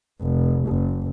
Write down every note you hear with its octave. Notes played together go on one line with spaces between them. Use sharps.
F1
F#1